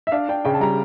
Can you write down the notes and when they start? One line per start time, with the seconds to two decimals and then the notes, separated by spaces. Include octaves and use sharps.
0.07 E5
0.12 D4 F5
0.29 D4 G5
0.45 C#3 G5
0.54 A5
0.61 G3 A#5